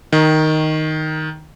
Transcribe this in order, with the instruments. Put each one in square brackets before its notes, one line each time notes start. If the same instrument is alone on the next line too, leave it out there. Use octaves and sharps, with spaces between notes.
[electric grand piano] D#3